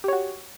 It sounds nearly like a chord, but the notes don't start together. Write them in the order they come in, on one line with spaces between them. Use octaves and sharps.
G4 C#5 F#4